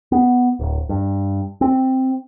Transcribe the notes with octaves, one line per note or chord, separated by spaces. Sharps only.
B3
D1
G2
C4